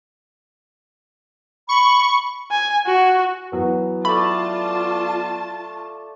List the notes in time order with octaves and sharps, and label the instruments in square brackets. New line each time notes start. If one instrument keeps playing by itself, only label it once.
[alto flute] B5 [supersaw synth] C#6
[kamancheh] G#5
F#4
[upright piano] E3 F#3 B3
[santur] A3 D5 [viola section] F4 A5 [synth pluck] B5